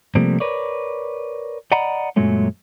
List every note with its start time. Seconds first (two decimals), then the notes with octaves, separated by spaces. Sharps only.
0.15 C3 F3 G3 A3 A#3 C4
0.40 A#4 B4 C#5 D5
1.72 D5 D#5 F#5 A#5 B5
2.16 F#2 A#2 F#3 G#3 A3 C#4